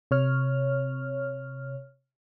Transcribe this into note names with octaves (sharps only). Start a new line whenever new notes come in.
C3 C#5 F6